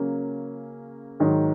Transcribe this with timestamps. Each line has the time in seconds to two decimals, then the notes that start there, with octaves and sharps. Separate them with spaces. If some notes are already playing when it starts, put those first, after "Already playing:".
Already playing: C#3 F#3 A#3 C#4
1.20 G#2 D#3 F#3